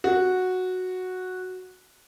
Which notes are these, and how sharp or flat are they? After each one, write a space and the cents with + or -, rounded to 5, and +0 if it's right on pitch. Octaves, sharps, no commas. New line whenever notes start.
F#4 -5